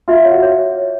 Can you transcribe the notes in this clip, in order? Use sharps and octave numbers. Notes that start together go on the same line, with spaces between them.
F4 E5
C#5
F#4
C#5